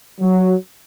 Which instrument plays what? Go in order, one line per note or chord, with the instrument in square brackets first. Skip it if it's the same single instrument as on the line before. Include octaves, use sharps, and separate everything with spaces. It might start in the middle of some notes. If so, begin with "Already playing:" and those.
[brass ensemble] F#3